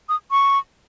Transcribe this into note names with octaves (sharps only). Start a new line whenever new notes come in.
D#6
C#6